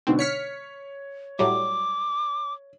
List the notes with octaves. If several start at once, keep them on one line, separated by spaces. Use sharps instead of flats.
G#2 B2 D3 C4
C#5 F6 B6 C#7
A2 F#3 G3 D6